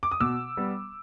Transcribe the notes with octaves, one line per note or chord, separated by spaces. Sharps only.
D6
D#6
B2 D6 E6
G3 B3